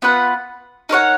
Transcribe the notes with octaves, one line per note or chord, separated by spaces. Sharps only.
B3 F4 B4 F#5
D#4 A#4 C#5 F#5